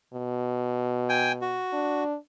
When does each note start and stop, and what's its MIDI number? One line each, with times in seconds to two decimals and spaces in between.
0.13 1.61 47
1.09 1.32 79
1.09 1.32 80
1.42 2.04 66
1.73 2.16 62